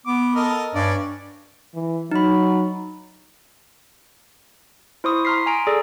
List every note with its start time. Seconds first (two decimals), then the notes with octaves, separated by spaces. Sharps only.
0.07 B3 D6
0.36 A4 A#4 D#5
0.75 G2 C#4 D5
1.74 E3
2.12 F#3 D#4 B5
5.04 E4 C5 C6 C#6 D#6
5.25 A#5 C6 F6 B6 C7
5.46 G#5 A#5 D7
5.67 G#4 A4 D5